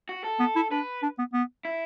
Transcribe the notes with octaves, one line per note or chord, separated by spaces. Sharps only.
F#4
A4
B3
E4
D4 B4
D4
B3
B3
E4